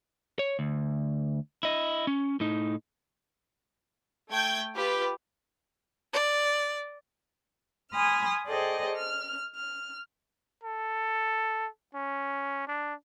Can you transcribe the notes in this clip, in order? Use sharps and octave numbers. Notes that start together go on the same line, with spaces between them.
C#5
D2
E4 D#5
C#4
A2 D#4
A3 G5 G6 G#6
F4 G4 B4
D5
G#5 B5 C6 D#6 F6
G#4 A4 C5 D5 D#5 G5
F6
F6
A4
C#4
D4